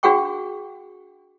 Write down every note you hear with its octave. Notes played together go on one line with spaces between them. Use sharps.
D4 F#4 G#4 F#5 G5 C#6